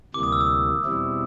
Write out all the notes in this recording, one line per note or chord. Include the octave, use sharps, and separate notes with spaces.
D2 C3 E3 G3 A#3 D6
D#6
E6
D#6
E2 B2 G3 C4 E4